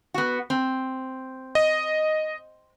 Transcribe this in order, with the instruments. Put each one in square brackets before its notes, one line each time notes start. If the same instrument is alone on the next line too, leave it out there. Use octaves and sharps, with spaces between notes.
[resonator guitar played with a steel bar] B3 F#4
C4
[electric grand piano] D#5